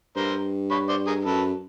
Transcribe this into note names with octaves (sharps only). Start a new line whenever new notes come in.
G2 A#4 C5
B4 C#5
C5 D5
G#4 A#4
F#2 A4 B4